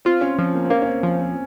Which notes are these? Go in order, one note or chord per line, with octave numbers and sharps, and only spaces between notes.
C4 F4
C#4
F3 C4
A#3
C4
A#3 C#4
C#4
C4
F3
C4